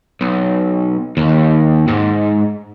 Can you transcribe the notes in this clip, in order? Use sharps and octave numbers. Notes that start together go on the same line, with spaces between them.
B1
D#2
G#2